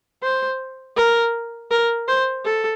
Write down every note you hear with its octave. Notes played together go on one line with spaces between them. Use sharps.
C5
A#4
A#4
C5
A4